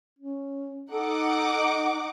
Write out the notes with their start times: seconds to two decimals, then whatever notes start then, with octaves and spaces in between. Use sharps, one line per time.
0.19 C#4
0.92 D#4 A4 F#5 D6